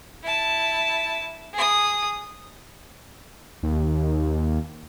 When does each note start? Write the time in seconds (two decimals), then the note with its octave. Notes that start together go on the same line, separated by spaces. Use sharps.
0.23 E4 A5
1.54 G#4 D#6
3.63 D#2